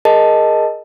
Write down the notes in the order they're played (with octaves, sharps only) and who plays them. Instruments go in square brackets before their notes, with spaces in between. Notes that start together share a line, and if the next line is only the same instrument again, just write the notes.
[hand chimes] G#4 A#4 D#5 A5